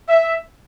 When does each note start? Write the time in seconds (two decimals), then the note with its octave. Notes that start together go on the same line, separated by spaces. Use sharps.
0.08 E5